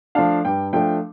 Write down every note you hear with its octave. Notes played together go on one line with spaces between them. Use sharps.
F3 A3 D4 F5 A5
G2 G5
F3 A3 D4 G5